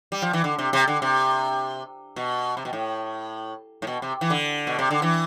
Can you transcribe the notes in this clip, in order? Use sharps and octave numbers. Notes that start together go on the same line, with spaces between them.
G3
F3
E3
D3
C3
C3
D3
C3
B2
C3
B2
A2
A2
B2
C3
E3
D3
B2
C3
D3
E3